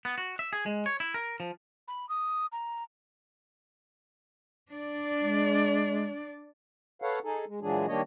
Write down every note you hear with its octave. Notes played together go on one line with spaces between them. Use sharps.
B3
F#4
E5
G#4
G#3
C#5
E4
A#4
F3
B5
D#6
A#5
D4 D5
G#3
A4 B4 C#5 F5 F#5
D#4 G#4 A4
G#3
A#2 E3 F#3 G#3 D4 G#4
D#3 G3 A#3 D4 C#5 D#5